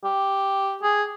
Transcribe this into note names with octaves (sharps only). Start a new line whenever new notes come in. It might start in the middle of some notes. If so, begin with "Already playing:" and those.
G4
G#4